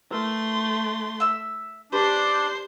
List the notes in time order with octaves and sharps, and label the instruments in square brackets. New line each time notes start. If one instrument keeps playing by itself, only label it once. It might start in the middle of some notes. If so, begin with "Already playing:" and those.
[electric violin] A3 C6 [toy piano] E4 A#4 B4
[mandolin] E5 E6
[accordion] D4 [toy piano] G4 [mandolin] B4 [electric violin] C5 C7